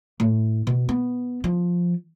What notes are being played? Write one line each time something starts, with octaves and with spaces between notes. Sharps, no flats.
A2
B2
B3
F3